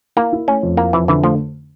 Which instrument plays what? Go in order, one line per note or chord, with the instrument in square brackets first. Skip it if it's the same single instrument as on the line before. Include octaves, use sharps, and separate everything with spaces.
[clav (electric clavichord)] A#3 [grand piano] E4
[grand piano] E4
[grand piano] A3 [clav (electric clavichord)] C#4
[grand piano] F2
[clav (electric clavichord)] A#3 [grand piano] E4
[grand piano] F2 [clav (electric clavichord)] E3
[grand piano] D3 [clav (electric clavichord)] E3
[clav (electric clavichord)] F3 [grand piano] A3